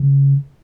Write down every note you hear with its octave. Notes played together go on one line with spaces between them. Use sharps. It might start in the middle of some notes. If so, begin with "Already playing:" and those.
Already playing: C#3